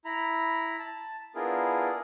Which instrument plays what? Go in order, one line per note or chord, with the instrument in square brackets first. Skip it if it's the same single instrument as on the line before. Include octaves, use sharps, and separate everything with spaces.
[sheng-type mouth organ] E4 A#5 B5
A5
B3 D4 E4 F4 G#4 A#4